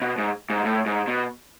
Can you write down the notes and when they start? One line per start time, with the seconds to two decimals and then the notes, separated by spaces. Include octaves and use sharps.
0.02 B2
0.18 G#2
0.50 G#2
0.65 A2
0.86 G#2
1.08 B2